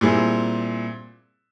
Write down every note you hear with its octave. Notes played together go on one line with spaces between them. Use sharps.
A#2 G3 C4 E4 G#4